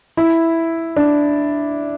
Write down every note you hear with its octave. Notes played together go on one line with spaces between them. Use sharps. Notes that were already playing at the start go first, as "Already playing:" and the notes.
E4
D4